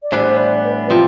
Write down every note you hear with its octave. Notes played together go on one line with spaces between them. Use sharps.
D5
A2 E3 G3 B3 D4 C5
D5
B4
C3 F3 C4 F4